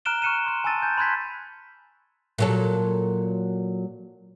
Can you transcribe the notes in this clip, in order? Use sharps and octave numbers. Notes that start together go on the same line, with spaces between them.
A#5 F6 F#6 D7 E7 G7
C#6 F6 F#6 C#7 D#7 E7
C6 F#6
G#5 A5 C6 E6 A6 D#7
G#5 G6
B5 C6 F#6 G#6 B6
A#2 F#3 A4